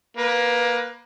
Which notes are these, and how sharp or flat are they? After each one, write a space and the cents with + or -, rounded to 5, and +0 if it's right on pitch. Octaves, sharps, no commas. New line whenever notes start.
A#3 +20 B4 +0